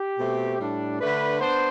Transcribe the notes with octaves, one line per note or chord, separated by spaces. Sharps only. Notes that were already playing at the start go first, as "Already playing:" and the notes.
Already playing: G4
B2 A3 C4
A2 G3 D4
D3 A3 D4 B4
B3 D4 C5